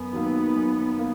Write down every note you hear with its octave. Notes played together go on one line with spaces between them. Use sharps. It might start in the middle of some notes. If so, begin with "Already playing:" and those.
Already playing: F#2 B3
D#3 F#3 A#3
F#2
A#3